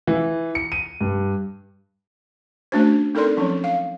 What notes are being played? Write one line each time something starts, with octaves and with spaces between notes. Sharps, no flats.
E3
C#7
D#7
G2
A3 C#4 D4 F#4 C5
C4 D#4 A4 A#4 D5 C6
F3 F#3 C#4
F5